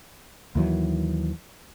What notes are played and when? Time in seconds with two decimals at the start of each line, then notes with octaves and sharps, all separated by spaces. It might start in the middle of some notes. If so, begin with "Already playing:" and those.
0.55 D#2 D#3 E3 F#3